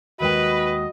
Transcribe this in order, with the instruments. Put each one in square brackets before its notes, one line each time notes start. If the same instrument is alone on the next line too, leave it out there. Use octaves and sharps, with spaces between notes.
[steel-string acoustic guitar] D#2 G#3 G5 [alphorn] F#4 [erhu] B4 [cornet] D#5